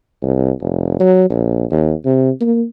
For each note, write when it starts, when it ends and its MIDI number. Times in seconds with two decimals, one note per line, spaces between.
0.22 0.51 36
0.61 0.97 29
0.99 1.27 54
1.30 1.65 34
1.71 1.93 39
2.05 2.30 48
2.41 2.64 58